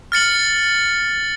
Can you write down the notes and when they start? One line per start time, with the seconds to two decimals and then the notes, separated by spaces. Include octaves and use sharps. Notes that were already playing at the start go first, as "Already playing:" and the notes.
0.12 F6 A6 C#7 F#7